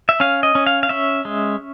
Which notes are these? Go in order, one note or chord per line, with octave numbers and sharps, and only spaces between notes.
E5
C#4 F5
D#5
C#4
F5
F5
C#4 E5
G#3